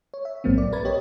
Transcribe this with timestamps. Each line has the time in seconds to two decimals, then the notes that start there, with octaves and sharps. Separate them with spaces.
0.14 C#5
0.25 E5
0.44 A#1 G#2 F#3 A#3 C4
0.58 D5
0.72 A#4 B4 B5 G#6 A6
0.85 G4 C#5 D#5